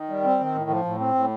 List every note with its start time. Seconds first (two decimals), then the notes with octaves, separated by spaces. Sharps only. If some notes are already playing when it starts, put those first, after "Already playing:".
Already playing: D#3
0.09 G3
0.25 C4
0.40 D#3
0.55 A2
0.70 F3
0.85 A2
1.00 C4
1.15 A2